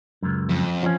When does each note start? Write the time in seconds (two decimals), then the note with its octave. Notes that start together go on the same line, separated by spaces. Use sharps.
0.23 C#2 F#2
0.50 F2
0.83 F3 C#4